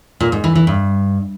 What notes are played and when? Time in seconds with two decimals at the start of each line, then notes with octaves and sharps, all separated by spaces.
0.20 A#2
0.32 G#2
0.44 E3
0.55 E3
0.67 G2